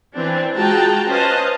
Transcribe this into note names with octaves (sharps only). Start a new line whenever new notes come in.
E3 C4 D4
G#3 F4 F#4 G5 A5 A#5
C#4 B4 C5 D#5 F5 A5